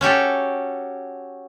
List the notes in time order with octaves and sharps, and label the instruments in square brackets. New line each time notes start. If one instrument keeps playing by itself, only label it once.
[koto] C#4 F#4 G4 A4